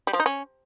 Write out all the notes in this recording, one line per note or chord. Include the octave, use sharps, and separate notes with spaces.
G3
F3
D#4
C#4